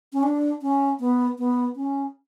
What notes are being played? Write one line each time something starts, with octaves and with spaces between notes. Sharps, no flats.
C#4
D4
C#4
B3
B3
C#4